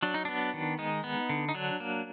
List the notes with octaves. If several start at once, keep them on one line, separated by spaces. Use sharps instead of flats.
F#3 D4
D#4
B3 D4
D#3
G#3 D#4
B3
D3
D#4
F#3 D4
A#3